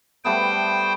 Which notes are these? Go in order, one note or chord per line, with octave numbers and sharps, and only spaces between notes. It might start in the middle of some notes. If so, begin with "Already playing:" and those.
G3 A3 B3 C5 G5